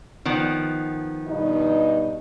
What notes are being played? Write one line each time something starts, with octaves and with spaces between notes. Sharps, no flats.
D#3 F3 B3
G2 B2 D#4